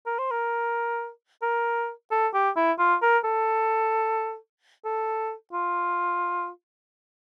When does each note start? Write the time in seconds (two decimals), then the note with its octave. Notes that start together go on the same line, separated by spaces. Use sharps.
0.06 A#4
0.19 C5
0.31 A#4
1.42 A#4
2.12 A4
2.34 G4
2.56 E4
2.79 F4
3.02 A#4
3.24 A4
4.85 A4
5.53 F4